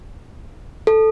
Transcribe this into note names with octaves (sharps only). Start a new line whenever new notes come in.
A4